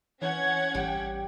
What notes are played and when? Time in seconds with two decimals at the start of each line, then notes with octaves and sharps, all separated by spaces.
0.22 E3 C#4 C#5 F#5 G#6
0.75 A1 G3 G5